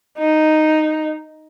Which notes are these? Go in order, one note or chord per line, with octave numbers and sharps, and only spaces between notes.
D#4